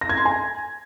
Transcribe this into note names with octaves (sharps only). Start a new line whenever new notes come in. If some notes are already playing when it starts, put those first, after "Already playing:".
A#6
G#6
C6
G#5